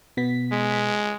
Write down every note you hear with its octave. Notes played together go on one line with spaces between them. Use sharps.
B2 B3 B6
G#3